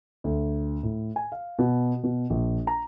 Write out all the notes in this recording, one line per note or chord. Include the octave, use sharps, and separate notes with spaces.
D2
A2
G#5
F5
B2
B2
A#1
A#5